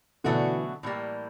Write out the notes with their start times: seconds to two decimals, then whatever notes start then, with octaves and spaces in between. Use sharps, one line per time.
0.24 B2 D3 E3 F#3 A3 D4 F#4
0.83 A2 E3 G3 A#3